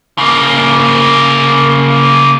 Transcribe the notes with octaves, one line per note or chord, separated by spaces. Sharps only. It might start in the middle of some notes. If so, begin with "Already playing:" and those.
C#3 A#3